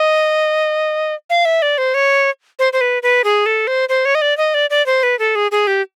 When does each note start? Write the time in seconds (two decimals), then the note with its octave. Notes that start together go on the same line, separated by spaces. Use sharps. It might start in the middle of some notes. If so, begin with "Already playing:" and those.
Already playing: D#5
1.30 F5
1.45 E5
1.62 D5
1.78 C5
1.94 C#5
2.59 C5
2.73 C5
2.81 B4
3.03 B4
3.24 G#4
3.46 A4
3.67 C5
3.89 C5
4.05 C#5
4.15 D#5
4.22 D5
4.37 D#5
4.54 D5
4.70 D5
4.86 C5
5.03 B4
5.19 A4
5.35 G#4
5.51 G#4
5.67 G4